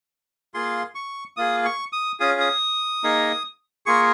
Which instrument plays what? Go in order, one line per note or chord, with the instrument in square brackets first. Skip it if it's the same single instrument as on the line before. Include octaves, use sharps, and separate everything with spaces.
[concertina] A#3 F4 G#4 C6
C#6
A#3 F4 G#4 D#6
C#6
D#6
C#4 F4 G#4 D#6
D#6
A#3 D#4 G#4
A#3 F4 G#4 C#6